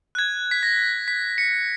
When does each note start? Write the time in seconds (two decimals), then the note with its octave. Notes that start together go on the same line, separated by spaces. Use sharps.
0.15 F#6
0.19 G#6
0.51 B6
0.63 A#6
1.08 B6
1.38 C#7